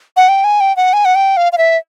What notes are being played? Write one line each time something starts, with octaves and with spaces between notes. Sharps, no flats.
F#5
G5
G#5
G5
F#5
G#5
F#5
G5
F5
F5
E5